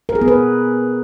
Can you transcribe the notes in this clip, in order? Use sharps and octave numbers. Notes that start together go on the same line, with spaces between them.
A#4
G#4
B3
B4